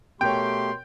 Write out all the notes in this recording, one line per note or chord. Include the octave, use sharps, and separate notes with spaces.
B2 A3 G4 A#4 C#5 G5 C6